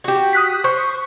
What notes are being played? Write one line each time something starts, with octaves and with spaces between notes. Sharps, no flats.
F#4 G4
D#6 F#6 B6
C5 C#6